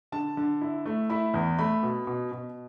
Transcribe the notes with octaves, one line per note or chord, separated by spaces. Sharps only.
D3 A5
D3
E4
A3
E4 B5
E2
A3 B5
B2
B2
B2